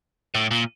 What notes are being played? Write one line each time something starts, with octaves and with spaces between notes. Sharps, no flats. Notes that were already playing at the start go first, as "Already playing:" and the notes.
A2
A#2